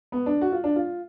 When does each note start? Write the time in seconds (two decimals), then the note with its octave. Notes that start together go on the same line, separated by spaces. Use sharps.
0.12 B3
0.26 D4
0.41 F#4
0.52 F4
0.64 D4
0.76 F4